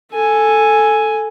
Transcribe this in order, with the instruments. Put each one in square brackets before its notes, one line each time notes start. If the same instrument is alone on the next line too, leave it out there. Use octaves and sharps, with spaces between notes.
[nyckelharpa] A4 G#5